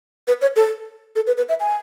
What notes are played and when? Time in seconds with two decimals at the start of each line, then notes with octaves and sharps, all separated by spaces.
0.28 B4
0.42 C#5
0.56 A4
1.16 A4
1.27 B4
1.37 B4
1.49 E5
1.60 G#5